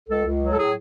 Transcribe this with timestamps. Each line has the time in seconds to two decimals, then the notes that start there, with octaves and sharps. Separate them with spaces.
0.09 C#2 A4
0.25 C#2
0.41 F#3
0.52 A4
0.57 A2 G#4